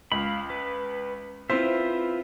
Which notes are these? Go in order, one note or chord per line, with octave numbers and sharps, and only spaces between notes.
C#2 F5 B5
B4
C4 E4 F4 B4 C5 E5